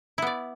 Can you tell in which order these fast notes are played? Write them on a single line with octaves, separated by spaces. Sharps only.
E4 B3 D5